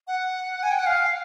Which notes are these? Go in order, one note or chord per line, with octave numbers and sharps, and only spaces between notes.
F#5
G#5
G5
F#5
F5